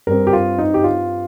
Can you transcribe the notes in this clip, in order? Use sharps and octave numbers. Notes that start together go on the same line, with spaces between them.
G2 G3 C4 A#4
G4
F4
D#4
G4
F4